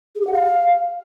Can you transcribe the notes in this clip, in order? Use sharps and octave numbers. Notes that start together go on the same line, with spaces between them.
G#4
G4
F#5
F5